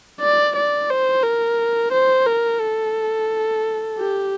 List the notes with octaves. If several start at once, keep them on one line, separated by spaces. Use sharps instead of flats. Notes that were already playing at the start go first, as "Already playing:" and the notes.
D5
D5
C5
A#4
C5
A#4
A4
G4